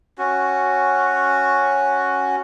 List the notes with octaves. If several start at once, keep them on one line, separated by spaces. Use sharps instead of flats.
C#4 F#4